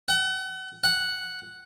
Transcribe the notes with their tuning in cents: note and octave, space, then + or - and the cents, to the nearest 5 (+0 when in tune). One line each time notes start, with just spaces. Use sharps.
F#5 +35
F#5 +0